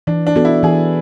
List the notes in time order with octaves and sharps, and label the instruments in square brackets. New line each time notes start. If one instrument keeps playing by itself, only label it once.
[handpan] E3 [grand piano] D4
[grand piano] D4
[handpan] B3 F#4 A4
[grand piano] E4
[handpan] E3 [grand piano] G#4